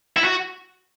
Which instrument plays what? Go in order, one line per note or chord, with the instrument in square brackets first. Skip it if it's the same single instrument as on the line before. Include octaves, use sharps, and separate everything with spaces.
[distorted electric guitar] E4
F#4